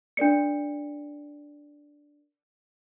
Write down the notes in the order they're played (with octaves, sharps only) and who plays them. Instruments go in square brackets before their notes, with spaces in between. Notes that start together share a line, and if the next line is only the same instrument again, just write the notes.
[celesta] D4 A#4 D5 C#7